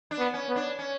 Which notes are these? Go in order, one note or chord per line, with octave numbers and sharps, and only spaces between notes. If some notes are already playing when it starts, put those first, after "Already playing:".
D4
B3
C#4
B3
D4
C#4